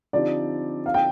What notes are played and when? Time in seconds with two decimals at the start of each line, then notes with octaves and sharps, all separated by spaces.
0.13 D3 F3 C4 D#4 G4 D5
0.86 F5
0.94 G5